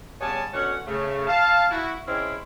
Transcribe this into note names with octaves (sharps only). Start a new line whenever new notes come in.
C#3 G3 B3 C#5 G#5 A5
B2 D3 C#4 C#5 F#5
C#3 A3
F5 A5
E4 F#4
G#3 C4 C#4 E4